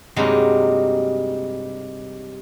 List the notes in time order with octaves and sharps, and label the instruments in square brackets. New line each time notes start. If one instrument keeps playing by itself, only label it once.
[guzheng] G2 C3 F#3 G#3 A#3 D#4